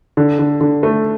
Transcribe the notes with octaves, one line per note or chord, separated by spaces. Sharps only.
D3
D3
D3
A3